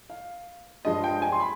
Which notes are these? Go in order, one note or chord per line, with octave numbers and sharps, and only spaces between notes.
F5
G2 F3 G#3 D#5
G5
G#5
C6
B5